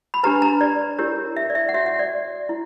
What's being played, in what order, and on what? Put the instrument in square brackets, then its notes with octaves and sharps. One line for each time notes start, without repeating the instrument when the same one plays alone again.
[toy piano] B5
D4 G4 B4 A#5
A#5
D5
E4 G4 A#4 C#5
E5
D5
E5
F#5
F#4 C#5 E5
F#5
D5
E4